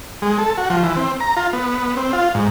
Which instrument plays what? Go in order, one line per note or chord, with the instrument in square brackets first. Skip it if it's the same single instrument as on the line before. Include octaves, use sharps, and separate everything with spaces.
[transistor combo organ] G#3
A4
F#4
F3
E3
C4
A#5
F4
B3
C4
F4
G#2